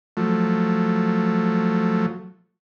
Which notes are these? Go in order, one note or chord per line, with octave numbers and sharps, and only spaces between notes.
F3 F#3 A3